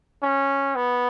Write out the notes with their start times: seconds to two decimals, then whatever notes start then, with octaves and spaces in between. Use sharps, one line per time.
0.23 C#4
0.76 B3